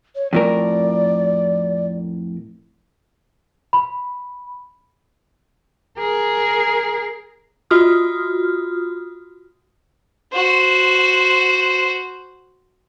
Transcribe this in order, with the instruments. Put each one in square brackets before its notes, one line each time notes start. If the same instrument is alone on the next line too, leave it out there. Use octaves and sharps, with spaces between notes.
[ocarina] C#5
[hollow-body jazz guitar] F2 A2 A#4 [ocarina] D5
[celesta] B5
[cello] G#4 A#4
[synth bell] F4 F#4 D#6 F6
[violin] F#4 C5